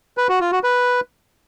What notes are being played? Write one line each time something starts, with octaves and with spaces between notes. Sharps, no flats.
B4
F#4
F4
F#4
B4